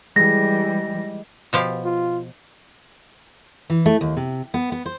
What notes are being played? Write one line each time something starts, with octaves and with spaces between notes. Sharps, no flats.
E3 G3 G#3 A#6
B2 F3 G4
F4
E3
A3
D#2
C3
B3
B3
C5